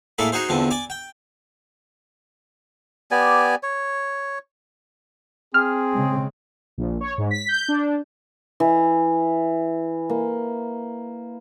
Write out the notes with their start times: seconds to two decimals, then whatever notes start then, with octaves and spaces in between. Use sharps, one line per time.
0.18 A2 A#3 G#4 A4 B5
0.32 D#4 F#4 G#4 C5
0.49 E2 D3 F3 C4
0.71 D5 G#5 D6
0.90 G5
3.11 B3 G4 D5 G#5
3.63 C#5
5.54 C4 G#4 F6
5.94 C#3 G#3
6.78 A#1
7.01 C#5
7.18 G#2
7.31 B6
7.48 G6
7.68 D4
8.60 E3
10.10 A#3